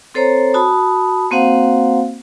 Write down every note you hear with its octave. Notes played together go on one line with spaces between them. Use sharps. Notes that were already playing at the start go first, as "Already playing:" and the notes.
C4 A4 C5 C#5 A#5
F#4 A5 B5 D#6
A#3 C4 F#4 C5 F5 F#5